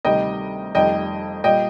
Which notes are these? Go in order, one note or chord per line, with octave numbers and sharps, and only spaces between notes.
D2 C3 D#3 G3 D#5 G5
F1 F2 D#3 G3 D#5 G5
A#2 G3 D#5 G5